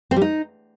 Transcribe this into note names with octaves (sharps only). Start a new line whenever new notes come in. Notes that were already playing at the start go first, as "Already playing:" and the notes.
C4
G3
D#4